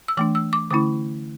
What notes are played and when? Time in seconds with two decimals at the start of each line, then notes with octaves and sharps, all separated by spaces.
0.08 E6
0.17 E3 A3 D4 D6
0.35 E6
0.53 D6
0.71 D3 A3 C#4 E4 D6